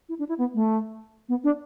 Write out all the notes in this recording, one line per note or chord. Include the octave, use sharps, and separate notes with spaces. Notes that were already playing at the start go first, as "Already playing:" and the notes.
E4
D4
E4
B3
A3
B3
D4